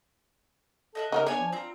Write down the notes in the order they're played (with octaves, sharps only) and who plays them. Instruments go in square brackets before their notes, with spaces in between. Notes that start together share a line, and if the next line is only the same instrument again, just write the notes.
[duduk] A4 [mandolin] D#5 E5 F#6
[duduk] C#3 [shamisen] D#4 F4 A#4
[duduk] B3 [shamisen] D4 [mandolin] C#5 G#5
[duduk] F3
[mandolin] C4 A#5 [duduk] F4